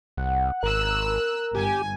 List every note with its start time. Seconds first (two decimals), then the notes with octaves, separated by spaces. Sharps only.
0.17 C2 F#5
0.63 G#1 A#4 E6 F#6
1.55 G1 G4 G#5